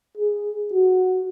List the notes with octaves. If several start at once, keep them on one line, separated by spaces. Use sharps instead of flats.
G#4
F#4